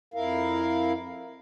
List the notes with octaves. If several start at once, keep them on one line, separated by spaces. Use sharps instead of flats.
F2 E4 A#4 F5